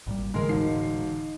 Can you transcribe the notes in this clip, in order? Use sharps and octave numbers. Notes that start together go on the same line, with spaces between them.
G#1 A#2 G3
A2 D3 E3 G#3 A#4
E1 D#4 C7